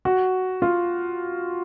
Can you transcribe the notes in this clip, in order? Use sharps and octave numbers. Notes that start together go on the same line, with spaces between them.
F#4
F4